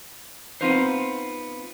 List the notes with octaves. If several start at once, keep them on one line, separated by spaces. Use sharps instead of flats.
B3 C4 D#4 F4 B4 C5